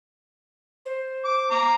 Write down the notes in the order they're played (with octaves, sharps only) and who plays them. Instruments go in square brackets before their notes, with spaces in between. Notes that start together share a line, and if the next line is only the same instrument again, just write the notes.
[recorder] C5
[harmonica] D6
A#5 D6